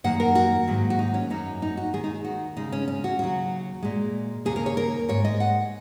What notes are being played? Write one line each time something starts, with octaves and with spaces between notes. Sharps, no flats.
F#2 D#3 A#3 F#5
A#4
F#4
G#2 D#3 F#3 A#3
F#4
D#4
C#4
F#2 F#3 A#3 D#4
D#4
F#4
D#2 D#3 G#3 G#4
D#4
F#4
D#2 C#3 G#3 D#4
C#4
C#4
F#4
D#2 C#3 F#3 F#4
A#2 G#3
D#2 C#3 A#3 G#4
A#4
C#5
A#4
G#2 G#3 C#5
D#5
F#5